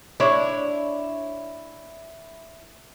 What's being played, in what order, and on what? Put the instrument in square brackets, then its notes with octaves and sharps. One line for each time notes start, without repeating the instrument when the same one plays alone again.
[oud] D4 [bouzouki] E4 C#5